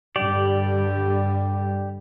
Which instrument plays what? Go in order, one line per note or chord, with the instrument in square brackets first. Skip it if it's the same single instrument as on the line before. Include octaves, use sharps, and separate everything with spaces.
[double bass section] G2 D3 G3 [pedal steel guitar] G4 D5